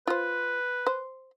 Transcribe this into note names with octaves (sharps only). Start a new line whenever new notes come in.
F4 B4 C5
C5